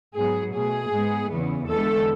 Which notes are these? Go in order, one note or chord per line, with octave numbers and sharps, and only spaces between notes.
G#2 F#3 B3 G#4
B2 A3 G#4
G#2 G#3 B3
E2 C#3 E3 B3
E2 D3 G#3 B3 A4